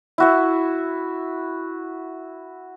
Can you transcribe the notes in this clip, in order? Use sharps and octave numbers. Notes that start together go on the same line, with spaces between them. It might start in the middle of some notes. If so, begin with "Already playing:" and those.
E4 F#4 E5